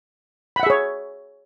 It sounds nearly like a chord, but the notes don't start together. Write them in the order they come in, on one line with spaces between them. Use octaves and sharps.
B5 F#5 E5 G#4 C#5